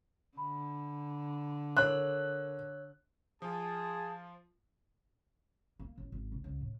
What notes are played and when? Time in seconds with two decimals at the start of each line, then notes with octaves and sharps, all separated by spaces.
0.37 D3 B5
1.77 A4 A#4 C#5 E6 F#6
3.42 F3 F4 G#4 A5
5.80 A#3
5.98 A1
6.12 G#1
6.32 C2
6.44 C#2
6.61 A2